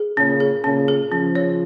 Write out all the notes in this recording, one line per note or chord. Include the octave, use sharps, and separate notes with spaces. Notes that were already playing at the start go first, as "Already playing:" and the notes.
Already playing: G#4
A#2 C#3 C#4
G#4
A#2 C#3 C#4
G#4
C#3 F3 C#4
C#5